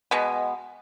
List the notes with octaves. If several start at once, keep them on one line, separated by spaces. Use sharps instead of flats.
B2 G#3 B3